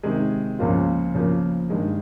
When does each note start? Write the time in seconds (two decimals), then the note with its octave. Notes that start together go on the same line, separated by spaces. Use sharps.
0.03 C3 D#3 G#3
0.59 C#2 C#3 F3 A#3 F4
1.15 C#3 F3 A#3
1.70 G2 D#3 G#3